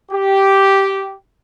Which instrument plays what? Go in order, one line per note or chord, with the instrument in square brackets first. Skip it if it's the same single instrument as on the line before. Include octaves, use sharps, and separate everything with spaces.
[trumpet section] G4